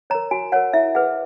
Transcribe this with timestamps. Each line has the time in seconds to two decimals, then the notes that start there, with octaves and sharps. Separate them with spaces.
0.10 A#4 C#5 A#5
0.31 F#4 G#5
0.52 A#4 C#5 F#5
0.73 E4 E5
0.95 G#4 B4 F#5